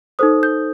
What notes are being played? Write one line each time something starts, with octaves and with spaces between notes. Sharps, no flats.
D#4 A4 C5 D#6
G6